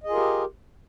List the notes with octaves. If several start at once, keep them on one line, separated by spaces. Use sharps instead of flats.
F4 G4 G#4 A#4 D#5